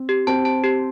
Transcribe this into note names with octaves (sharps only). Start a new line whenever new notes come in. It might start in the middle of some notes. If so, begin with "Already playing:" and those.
Already playing: C4
G4
C4 C5 A5
A5
G4